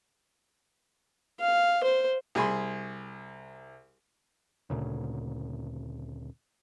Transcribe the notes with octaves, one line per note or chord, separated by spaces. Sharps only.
F5
C5
C2 G#4 G#5 B5 C6
D2 A#2 C#3